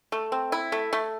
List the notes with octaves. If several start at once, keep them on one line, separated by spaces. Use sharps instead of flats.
A3
C4
E4
A3
A3